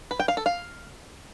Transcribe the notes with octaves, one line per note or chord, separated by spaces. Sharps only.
B4
G5
F5
A4
F5